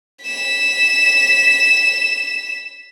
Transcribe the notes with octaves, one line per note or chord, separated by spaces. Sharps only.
B6 E7